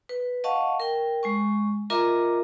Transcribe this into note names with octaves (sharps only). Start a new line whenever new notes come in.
B4
D#5 F5 F#5 A5 C#6
A#4 G5
G#3 G#5 C#6
F4 A#4 D#5 E5 A#5 D6